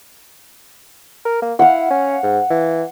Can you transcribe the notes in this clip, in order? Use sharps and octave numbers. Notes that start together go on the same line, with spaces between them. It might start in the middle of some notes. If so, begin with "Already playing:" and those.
A#4
A#3
E4 F5 F#5
C#4
G#2
E3